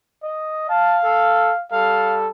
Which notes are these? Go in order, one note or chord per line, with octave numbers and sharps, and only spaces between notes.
D#5
F5 A5
A4
G3 A4 F5